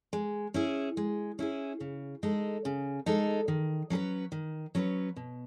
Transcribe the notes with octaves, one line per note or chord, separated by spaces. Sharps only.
G#3
C#4 E4 G#4
G#3
C#4 E4 G#4
C#3
G#3 D#4 A4
C#3
G#3 D#4 A4
D#3
F#3 C#4 G#4 B4
D#3
F#3 C#4 G#4 B4
B2